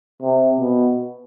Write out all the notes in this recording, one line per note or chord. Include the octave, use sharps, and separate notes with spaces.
C3
B2